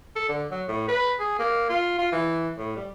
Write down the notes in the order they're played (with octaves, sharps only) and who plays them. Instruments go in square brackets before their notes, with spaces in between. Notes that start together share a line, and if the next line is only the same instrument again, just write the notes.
[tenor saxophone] A4
D3
F#3
A2
B4
G#4
A#3
F4
F4
E3
A2
G3